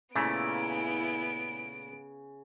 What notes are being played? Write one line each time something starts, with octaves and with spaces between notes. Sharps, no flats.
A#2 C#3 A3 B3 E4 D7